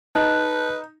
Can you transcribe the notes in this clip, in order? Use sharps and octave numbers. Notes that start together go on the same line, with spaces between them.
D#4 B4 A5 F#6